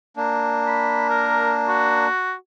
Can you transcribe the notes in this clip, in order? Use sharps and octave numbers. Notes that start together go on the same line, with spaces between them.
A#3 D4
B5
A#4
F#4